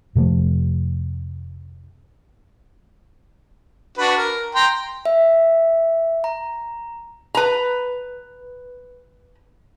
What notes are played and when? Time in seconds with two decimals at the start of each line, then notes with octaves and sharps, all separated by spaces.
0.15 F2 C3 F3 A3
3.98 D4 F#4 B4
4.18 A#4
4.55 G5 A#5 C6
5.06 E5
6.24 A#5
7.35 B4 A#5